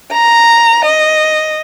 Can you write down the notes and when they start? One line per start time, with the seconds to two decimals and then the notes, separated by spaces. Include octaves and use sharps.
0.13 A#5
0.86 D#5